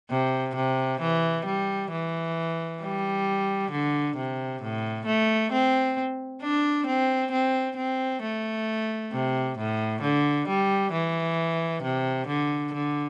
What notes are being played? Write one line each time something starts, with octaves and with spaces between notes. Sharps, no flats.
C3
C3
E3
G3
E3
G3
D3
C3
A2
A3
C4
D4
C4
C4
C4
A3
C3
A2
D3
G3
E3
C3
D3
D3